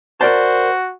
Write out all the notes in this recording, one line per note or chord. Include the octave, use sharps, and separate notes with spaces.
F#4 A#4 C5 D5 A5